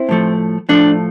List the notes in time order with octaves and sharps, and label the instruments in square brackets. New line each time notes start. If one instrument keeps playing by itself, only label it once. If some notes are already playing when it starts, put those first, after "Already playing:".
Already playing: [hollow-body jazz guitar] C4 E4
A2 F3 A3
A2 F3 A3 D4